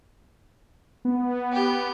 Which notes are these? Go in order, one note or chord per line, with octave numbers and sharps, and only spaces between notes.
B3
G4